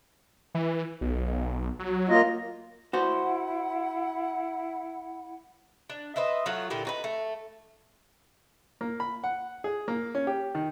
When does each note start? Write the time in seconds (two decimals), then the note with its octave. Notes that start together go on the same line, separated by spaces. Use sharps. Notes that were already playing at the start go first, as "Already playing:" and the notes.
0.55 E3
1.01 B1
1.79 F#3
2.09 A#3 F4 D#5
2.93 E4 F#4 C5 F#5
5.90 D4
6.16 B4 C5 D#5 E5
6.46 F#3 A3 F4 F#5
6.70 A#2 D3 E4 G4
6.85 D#4 F#4 B4
7.04 A3
8.81 A#3
9.00 B5
9.24 F#5
9.64 G#4
9.88 A#3
10.15 C#4
10.27 G4
10.55 D#3